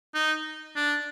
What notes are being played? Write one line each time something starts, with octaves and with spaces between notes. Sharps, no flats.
D#4
D4